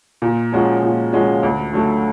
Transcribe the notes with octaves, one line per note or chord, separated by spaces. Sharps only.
A#2
F3 G#3 C#4 F#4
A#2
F3 G#3 C#4 F#4
D2
D3 F#3 A3